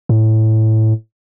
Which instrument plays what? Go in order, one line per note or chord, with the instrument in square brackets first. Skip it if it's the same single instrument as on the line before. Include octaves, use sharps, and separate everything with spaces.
[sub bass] A2